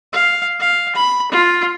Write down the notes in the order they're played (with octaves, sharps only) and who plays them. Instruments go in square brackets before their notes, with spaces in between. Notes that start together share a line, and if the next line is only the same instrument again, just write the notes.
[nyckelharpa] F5
F5
B5
F4